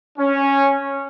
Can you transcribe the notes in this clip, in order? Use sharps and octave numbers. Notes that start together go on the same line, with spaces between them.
C#4